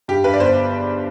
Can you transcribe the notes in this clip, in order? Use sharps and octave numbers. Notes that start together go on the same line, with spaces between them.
G2 G4
G2 B4
D5
G1 C5